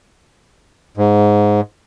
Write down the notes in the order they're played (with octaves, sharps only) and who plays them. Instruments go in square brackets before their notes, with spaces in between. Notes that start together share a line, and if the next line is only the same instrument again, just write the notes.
[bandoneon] G#2